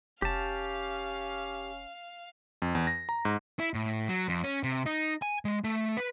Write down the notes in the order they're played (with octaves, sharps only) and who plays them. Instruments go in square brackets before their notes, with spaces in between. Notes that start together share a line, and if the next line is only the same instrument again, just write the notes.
[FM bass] F1 [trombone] C#4 [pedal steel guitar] G4 A5 [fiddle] F5
[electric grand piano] F2
E2
A#6
A#5
G#2
[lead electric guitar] E4
A2
F#3
F2
C#4
C3
D#4
G#5
G#3
A3
B4